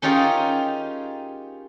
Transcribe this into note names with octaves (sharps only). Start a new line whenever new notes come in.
C#4 D#4 F4 G4 G#4 A#4